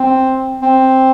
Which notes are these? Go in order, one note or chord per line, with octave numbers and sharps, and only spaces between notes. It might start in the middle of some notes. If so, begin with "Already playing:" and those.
Already playing: C4
C4